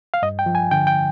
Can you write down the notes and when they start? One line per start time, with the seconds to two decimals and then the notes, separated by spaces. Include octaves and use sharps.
0.14 F5
0.22 G2 D#5
0.39 G5
0.46 F3
0.55 G#5
0.71 D3 G5
0.87 G5